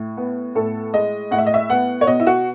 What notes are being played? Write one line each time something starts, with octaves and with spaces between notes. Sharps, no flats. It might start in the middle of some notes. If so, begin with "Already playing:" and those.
Already playing: A2
B3
A2 A4
G#3 D#5
A2 F#5
E5
D#5
E5
B3 F#5
C#5
B2 D#5
E4
F#4